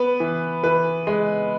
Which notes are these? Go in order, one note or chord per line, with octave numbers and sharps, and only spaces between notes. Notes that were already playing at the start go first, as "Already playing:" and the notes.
Already playing: B3 B4
E3
E3 B4
G#3